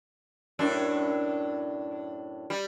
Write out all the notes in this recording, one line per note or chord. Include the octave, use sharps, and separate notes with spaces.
F#2 A2 D4
G3